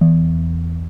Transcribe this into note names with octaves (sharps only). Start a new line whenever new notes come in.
E2